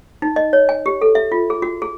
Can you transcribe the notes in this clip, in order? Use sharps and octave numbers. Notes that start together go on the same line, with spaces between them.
D#4
D#5
C#5
G#5
G4
A4
E5
F4
G#4
F#4
G#4